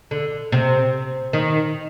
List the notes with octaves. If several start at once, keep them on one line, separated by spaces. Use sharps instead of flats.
D3
C3
D#3